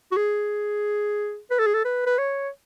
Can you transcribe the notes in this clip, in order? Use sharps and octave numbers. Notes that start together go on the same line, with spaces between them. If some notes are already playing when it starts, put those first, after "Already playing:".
F#4
G#4
B4
A4
G#4
A4
B4
B4
C#5